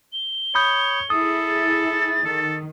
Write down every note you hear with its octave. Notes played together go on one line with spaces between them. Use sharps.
G7
C#5 B5 D#6 G6
E4 G#4 A4 D#6
A6
D#3 A4